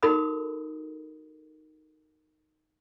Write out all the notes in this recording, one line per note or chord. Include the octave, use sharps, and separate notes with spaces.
D#4 F#4 A4 A#4 B5 D#6